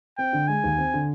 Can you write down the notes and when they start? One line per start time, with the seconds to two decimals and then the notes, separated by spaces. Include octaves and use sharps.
0.18 C4 G5
0.33 D3
0.48 G#3 G#5
0.64 D#2
0.78 C4
0.94 D3